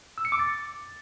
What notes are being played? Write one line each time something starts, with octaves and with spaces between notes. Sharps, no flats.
E6
C#7
D6
A6